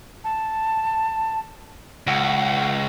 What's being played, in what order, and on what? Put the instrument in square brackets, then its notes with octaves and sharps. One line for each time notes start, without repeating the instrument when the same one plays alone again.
[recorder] A5
[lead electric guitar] C#2 [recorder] F#5